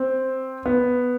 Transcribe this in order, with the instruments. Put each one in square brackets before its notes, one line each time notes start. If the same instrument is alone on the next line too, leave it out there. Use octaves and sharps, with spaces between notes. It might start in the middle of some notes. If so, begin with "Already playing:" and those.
Already playing: [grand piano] C4
B3